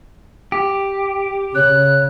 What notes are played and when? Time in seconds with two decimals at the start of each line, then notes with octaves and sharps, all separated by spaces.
0.52 G4
1.55 C#3 C#5 F#6